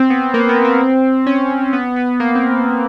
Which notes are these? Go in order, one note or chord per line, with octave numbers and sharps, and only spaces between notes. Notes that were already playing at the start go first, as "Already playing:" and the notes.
Already playing: C4
B3
A#3
B3
C4
C#4
B3
B3
A#3
C4